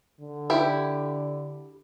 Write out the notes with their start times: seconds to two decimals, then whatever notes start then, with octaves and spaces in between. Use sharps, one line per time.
0.20 D3
0.50 E4 G4